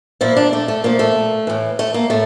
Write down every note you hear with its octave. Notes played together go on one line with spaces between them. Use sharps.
A#2 F3 E4
D4
A3
A3
A#2 F3 A#3
A3
A2 E3
A3
A#3
A2 A3